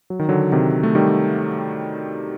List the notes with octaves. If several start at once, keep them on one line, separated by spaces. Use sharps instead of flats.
F#3
D#3
D3 F#3
C3 D#3
A3
D#3 G3